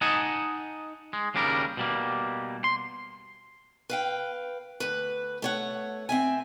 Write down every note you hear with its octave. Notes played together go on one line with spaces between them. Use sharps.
D#4 D#5 F#5 G#5 A5
G#3
D#2 C#3 G3 D4 A#4
B2 G3 A#3
C6
B4 F5 G5
D2 B4
A3 C#5 F#5
C4 E5 G#5